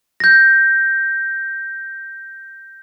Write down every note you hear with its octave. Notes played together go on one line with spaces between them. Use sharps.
G6 A#6